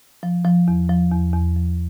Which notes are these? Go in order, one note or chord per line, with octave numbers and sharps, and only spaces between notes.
F3
F3
E2
F3
E2
E2
F3